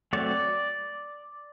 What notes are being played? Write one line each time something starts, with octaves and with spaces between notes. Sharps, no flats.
F#3 A3 C4 D5